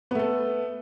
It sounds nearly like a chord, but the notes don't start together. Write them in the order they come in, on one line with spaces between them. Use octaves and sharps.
B3 A3 A4